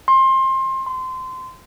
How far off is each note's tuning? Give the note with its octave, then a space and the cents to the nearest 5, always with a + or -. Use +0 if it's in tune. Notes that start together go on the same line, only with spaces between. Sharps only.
C6 +25
C6 -25